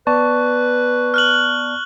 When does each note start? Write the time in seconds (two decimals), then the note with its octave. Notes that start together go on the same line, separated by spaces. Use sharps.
0.07 B3 B4 D5 A5 C#6
1.14 F6 F#6 F#7